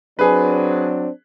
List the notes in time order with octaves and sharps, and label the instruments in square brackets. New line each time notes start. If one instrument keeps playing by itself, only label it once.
[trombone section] F#3 C4 D4 [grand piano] G#4 B4